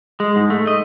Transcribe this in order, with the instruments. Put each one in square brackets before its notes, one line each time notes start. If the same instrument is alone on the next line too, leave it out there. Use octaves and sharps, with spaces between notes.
[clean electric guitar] G#3
G#2
A3
D#5